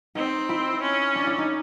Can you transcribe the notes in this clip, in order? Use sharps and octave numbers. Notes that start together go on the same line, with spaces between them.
C4 D#4
E4
C#4
D4
E4
D#4